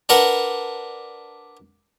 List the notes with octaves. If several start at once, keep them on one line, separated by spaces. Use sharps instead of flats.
D4 A#4 B4 F#5